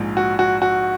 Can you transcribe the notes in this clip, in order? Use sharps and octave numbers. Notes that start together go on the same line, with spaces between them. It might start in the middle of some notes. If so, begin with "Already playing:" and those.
Already playing: A#1 G#2 F3
F#4
F#4
F#4